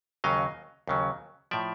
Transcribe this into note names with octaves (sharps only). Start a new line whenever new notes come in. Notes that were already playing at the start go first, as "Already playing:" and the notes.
D#2 C#3 F#3 D#5 F5
D#2 C#3 F#3
A2 F3 D5 E5